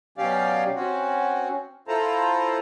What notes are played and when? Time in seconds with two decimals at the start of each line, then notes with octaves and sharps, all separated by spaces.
0.18 B2 F#3 C#4 G4 D5 F5
0.75 C4 C#4 F#4
1.88 E4 F4 A4 C5 A5 A#5